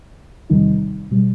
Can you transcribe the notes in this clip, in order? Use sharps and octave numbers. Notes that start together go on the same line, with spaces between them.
E2 C3 D#3 G3 D#4
B2 G3